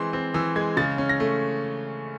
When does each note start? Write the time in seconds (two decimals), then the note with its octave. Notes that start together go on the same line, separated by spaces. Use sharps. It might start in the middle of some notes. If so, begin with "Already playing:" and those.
Already playing: E3 G#3 C4 C6
0.13 C4
0.34 E3 E6
0.56 G#3 G#6
0.77 C#3 A6
0.98 C#4
1.09 A#6
1.20 A3